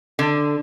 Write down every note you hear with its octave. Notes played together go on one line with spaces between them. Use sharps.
D3